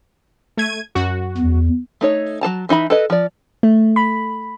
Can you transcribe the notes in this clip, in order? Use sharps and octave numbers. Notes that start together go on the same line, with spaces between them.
A3 G#6 D#7
F#2 F#4
E2
A3 D#4 C#5
F#3 A4 A5 A#5
E3 D#4 E5 B5
A4 B4 D#5
F3 D5
A3
B5